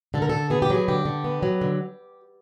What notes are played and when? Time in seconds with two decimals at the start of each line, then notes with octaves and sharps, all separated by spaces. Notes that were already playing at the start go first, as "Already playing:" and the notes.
0.14 D3 A4
0.22 A#4
0.29 D3 A4
0.50 B3 G#4
0.62 G4
0.70 F#3 G#4
0.88 D3 G4
1.05 D3
1.24 B3
1.43 F#3
1.61 D3